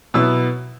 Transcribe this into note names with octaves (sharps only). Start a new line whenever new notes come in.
B2 F#3 B3 E4 E6